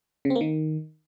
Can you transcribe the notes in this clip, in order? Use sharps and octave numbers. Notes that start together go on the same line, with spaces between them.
C#3
C4
A#3
D#3